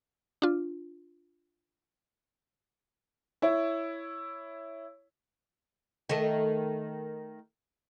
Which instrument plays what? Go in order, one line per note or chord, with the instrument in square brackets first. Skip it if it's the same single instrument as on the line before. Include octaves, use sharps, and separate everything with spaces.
[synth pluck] D4 F4
[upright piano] E4 C#5 E5
[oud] D#3 A3